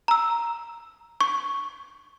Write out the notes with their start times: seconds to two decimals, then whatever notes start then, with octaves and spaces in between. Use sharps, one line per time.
0.08 A#5 E6
1.21 C#6